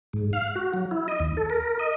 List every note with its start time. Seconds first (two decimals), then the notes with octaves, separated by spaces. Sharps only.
0.13 G#2
0.33 F5
0.55 F#4
0.74 F#3
0.91 E4
1.08 D#5
1.20 D#2
1.37 A4
1.50 A#4
1.79 D#5